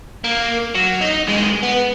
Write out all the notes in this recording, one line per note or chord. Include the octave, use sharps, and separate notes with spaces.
A#3
F#3
D#4
C2 G#3
B3